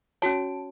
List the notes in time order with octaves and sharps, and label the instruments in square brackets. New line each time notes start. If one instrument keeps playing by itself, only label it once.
[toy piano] C#4 F#4 C#5 [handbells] A5